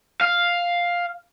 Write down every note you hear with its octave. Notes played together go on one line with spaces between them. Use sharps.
F5